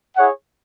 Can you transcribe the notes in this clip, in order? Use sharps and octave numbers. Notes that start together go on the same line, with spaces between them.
E4 G#4 C#5 F#5